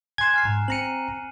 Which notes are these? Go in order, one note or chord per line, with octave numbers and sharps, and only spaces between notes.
G#5 C6 F#6 G#6 E7
G#5 F6 C7
G#2 A#5
C4 A#5 C#7 D#7 F#7